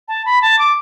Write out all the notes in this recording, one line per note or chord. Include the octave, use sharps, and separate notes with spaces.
A5
B5
A5
D6